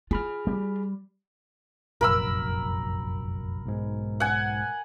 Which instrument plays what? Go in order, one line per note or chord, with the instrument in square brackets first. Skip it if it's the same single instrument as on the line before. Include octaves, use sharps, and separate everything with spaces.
[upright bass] F4 [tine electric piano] G#4 B5 F6
[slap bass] G3
[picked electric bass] F1 A#1 F#2 [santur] A#4 B5 E6
[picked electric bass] B1 G#2
[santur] F#5 G#5